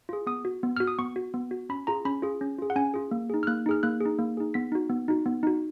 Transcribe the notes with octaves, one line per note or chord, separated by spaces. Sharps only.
F4 G#4
B3 D#6
F#4
B3
F#4 F6
D#6
B3 C#6
F#4
B3
F#4
C#4 B5
F4 G#4 A#5
C#4 B5
F4 G#4
C#4
F4 G#4
F#5
C#4 G#5
F4 G#4
A#3
D#4 G#4
F6
A#3 F#6
D#4 G#4 F6
A#3 F#6
G#4
D#4
A#3
D#4 G#4
B3 B6
D#4 F#4
B3
D#4 F#4
B3
D#4 F#4